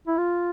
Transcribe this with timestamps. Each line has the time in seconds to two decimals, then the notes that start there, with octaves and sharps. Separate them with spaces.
0.07 E4
0.17 F4